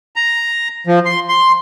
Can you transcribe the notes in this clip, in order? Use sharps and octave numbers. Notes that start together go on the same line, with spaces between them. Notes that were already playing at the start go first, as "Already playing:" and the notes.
A#5
F3
C6
C6